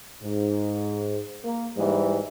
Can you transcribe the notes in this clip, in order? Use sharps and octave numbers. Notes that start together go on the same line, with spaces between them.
G#2
A#3
G#2 E3 G3